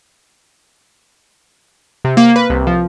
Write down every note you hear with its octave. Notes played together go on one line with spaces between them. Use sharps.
C3
A#3
B4
C2
F3